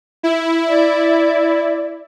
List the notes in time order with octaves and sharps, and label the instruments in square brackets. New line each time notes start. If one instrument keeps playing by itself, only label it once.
[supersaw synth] E4
[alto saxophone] D5